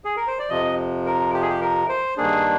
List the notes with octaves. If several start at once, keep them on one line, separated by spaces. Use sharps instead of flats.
G#4
A#4
C5
D5
F2 C3 F3 D#5
A#4
G4
G#4
G4
A#4
C5
G2 D#3 A#3 D4 G#4